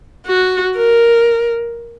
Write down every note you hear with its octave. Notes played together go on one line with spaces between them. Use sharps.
F#4
A#4